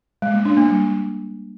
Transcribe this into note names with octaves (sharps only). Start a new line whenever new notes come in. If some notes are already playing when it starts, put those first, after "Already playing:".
G#3
A#3
D4
A#3
G3